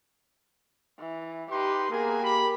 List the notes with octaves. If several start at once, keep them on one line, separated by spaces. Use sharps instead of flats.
E3
D#4 G4 B4 C6
A#3 B3 G#4 A#4 G#5
G4 B5